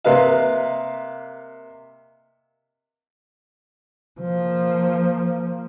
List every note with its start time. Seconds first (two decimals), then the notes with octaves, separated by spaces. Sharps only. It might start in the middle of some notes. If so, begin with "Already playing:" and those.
0.04 C3 A#3 B4 D#5 F5
4.21 F3 A#3